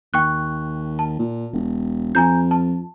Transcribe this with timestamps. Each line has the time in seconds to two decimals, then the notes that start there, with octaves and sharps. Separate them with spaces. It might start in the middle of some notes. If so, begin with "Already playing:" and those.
0.14 D#2 G5 C#6 F#6
0.99 A5
1.19 A#2
1.53 E1
2.15 F2 G#5 A#5 G6
2.51 A5